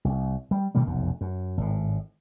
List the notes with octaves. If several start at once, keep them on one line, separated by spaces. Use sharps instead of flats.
C2
G3
B2 D#3 G3 A#3
F1 B1 F#2
F#2
G#1 A2